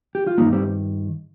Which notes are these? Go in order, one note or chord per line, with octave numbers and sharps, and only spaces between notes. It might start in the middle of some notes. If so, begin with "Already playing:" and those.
G4
F4
G2 D#3 A#3 D#4
G3 C4